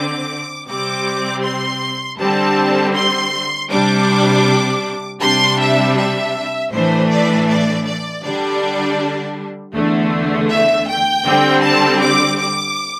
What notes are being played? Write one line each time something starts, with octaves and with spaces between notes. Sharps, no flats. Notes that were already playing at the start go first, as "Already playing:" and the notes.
Already playing: D3 C4 D6
C3 G3 C4 D6
C6
D3 G3 C4 A5
C6
C3 G3 D4 D6
C3 G3 D4 C6
E5
E5
A2 E3 A3 D4 C5
D5
D5
D5
D3 G3 D4 D5
E2 D3 A3
E5
G5
D3 G3 C4
A5
D6
D6